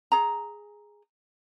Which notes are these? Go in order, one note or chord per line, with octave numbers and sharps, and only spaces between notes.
G#4 A#5